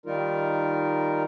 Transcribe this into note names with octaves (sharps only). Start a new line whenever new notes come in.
D#3 G3 D#4 F4 A#4